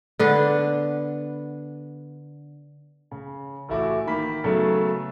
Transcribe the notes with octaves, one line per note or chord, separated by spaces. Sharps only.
D3 B3 D4
C#3
A1 A3 E4 F#4 D6
D#3 A#3 B5 B6
C#3 F#3 A3 B3 A4 C#5